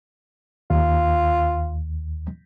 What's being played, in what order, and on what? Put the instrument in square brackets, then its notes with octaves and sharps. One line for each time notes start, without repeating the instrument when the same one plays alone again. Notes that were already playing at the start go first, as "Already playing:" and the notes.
[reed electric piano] D#2 [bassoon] F4